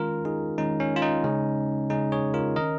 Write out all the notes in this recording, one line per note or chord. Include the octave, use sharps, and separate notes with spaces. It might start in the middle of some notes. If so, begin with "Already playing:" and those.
Already playing: D#3 G#3 C#4 F4 A#4
D#4 G#4
D#3 G#3 C#4 D#4
C#4
F4
D#4
C#3 G#3 C#4
C#3 G#3 C#4 D#4 G#4
G#4 C#5
F4 A#4
D#3 C#4 A#4 D#5